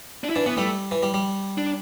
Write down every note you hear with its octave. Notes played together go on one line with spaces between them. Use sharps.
D4
E4
E3 D4
E3 B3
G3 A3
E3
G3
G3
D4